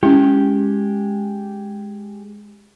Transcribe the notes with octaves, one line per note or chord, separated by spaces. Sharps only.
G#3 C#4 E4 G4